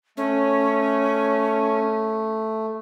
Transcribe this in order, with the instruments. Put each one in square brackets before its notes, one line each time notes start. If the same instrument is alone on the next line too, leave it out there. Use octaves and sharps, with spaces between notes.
[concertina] A3 [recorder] C#4